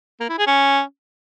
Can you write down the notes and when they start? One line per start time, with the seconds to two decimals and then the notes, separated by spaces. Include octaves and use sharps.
0.20 A#3
0.29 E4
0.38 G#4
0.47 C#4